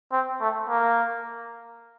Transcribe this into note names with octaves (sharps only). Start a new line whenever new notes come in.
C4
A3
A#3